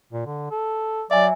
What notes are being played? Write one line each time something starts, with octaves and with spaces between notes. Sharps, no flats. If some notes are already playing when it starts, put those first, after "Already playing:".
A#2
D3
A4
F#3 D5 E5 G#5